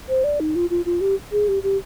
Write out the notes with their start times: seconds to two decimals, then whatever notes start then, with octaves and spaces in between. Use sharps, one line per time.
0.09 C5
0.24 D5
0.40 D#4
0.56 F4
0.70 F4
0.86 F4
1.01 G4
1.32 G#4
1.48 G4
1.63 G4